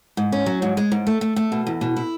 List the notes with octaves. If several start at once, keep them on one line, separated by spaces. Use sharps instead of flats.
G#2
C#4
F#3
G#2
G#3
G#2
A3
A3
A3
B2
E2
B2
E4